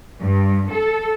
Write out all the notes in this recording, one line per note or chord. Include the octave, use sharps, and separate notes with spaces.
G2
A4